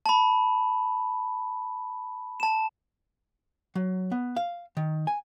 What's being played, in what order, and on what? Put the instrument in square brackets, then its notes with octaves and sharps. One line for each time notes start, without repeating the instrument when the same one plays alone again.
[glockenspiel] A5 B5
A5 E7
[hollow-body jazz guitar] F#3
B3
F5
D#3
G#5